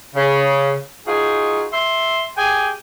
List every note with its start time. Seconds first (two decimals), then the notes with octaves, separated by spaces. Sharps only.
0.16 C#3
1.06 D#4 F4 F#4 G#4
1.72 E5 C6
2.37 G4 G#4 G5 G#5